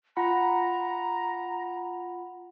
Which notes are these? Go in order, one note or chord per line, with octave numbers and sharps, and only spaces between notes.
F4 F#5 A#5 B5